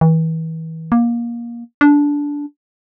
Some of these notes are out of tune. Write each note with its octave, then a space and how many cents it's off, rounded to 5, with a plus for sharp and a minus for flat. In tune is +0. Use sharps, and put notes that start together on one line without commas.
E3 -35
A#3 +20
D4 -15